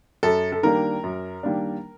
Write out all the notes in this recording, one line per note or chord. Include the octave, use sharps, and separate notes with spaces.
F#2 A4
A4
D#3 G3 A#3 D4 A#4
F#2
D#3 G3 A#3 D4